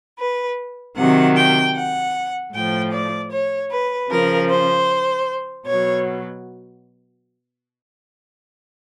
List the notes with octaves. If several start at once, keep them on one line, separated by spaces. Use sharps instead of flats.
B4
C3 D#3 F#3 F#5
G5
F#5
A2 F3 G5
D5
C#5
B4
C#3 F3 A#4
C5
B2 F#3 C#5